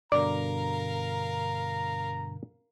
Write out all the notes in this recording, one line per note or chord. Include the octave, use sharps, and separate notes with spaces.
G2 B2 D3 A#4 D5 F5 A#5